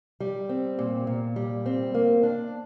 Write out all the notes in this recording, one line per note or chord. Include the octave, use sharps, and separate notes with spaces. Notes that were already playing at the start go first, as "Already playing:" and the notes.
G3
C4
A#2
A#2
G3
C4
A#3
D4